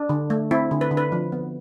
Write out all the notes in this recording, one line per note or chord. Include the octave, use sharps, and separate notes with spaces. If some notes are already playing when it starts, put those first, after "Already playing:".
Already playing: D4
D3
A3
C4 E4
D3
B4
D3
B4
F3
B3